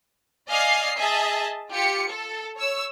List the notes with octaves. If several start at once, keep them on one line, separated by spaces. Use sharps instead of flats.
D5 D#5 F5 G#5 F6 C7
G#4 D#5 E5 G#5 A5
F4 G4 C#7
A4
C#5 E6